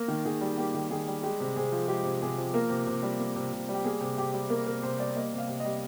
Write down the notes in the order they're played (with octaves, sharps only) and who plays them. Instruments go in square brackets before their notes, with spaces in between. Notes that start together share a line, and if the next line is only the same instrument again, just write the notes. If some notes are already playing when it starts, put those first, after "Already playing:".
Already playing: [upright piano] A#3 A#4
D#3
D#3 G#4
G3
A#3 G4
D#3
D#3 G#4
G3
G#3 G4
C3
C3 G#4
F3
G#3 G4
C3
C3 G#4
F3
A#3 A#4
C3
C3
G3
A#3
C3
C3
G3
G4
A#3 G#4
C3
C3 G4
G3
A#3 A#4
C3 A#4
C3 C5
G3 D5
A#3 D#5
C3
F5
C3
G3 D#5